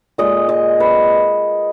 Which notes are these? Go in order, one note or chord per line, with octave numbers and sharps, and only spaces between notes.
A#2 G#3 D#5
D#5
B4